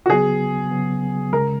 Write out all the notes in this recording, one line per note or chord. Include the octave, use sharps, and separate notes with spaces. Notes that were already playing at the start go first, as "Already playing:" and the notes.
F#4
C#3 F#3 B3 G#4
C#3 F#3 B3
C#3 G#3 A#4